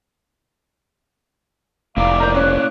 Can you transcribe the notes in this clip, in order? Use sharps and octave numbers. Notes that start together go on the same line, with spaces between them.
F1 A#3 E4 D5 F5 A#5
A#4 A#5 G6
C#4 F#6